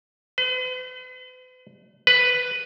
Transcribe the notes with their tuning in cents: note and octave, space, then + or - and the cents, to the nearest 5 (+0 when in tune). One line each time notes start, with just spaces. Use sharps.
B4 +45
B4 +5